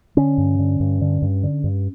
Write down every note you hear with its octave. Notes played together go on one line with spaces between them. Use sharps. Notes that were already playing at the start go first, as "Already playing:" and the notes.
D3 C#4
G2
D3
G2
D3
G2
D3
G2